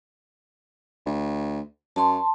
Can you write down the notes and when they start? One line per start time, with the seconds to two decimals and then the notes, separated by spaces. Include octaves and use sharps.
1.06 D2
1.96 F#2 A5 C6